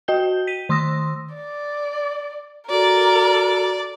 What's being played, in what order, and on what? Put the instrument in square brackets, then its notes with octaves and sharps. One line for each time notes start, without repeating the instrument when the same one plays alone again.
[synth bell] F#4 D#5 G5 G6 G7
B6 D#7
D#3 C6 D#6 E6 A#6
[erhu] D5
[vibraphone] F#4 A4 [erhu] A#4 [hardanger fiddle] D5